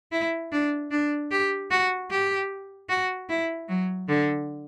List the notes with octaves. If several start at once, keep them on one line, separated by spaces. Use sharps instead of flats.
E4
D4
D4
G4
F#4
G4
F#4
E4
F#3
D3